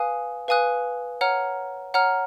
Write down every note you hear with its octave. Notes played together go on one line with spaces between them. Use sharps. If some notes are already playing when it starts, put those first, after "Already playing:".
Already playing: B4 F5 G#5 D#6 F#6
B4 F5 G#5 D#6 F#6
C#5 F#5 A#5 F6
C#5 F#5 A#5 F6